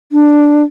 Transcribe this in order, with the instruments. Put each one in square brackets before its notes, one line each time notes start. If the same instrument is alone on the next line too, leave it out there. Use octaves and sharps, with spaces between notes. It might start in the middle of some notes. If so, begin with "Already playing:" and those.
[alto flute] D4